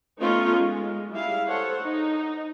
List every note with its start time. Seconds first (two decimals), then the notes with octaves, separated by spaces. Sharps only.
0.21 A3 B3 C#4 D#4 F4
0.59 G#3
1.12 G3 E4 G#4 F5
1.47 A4 C5 C#5 F#5
1.82 D#4